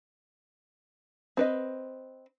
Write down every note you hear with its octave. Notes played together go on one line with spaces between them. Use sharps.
C4 B4 D#5